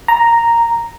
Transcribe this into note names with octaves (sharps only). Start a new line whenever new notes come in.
A#5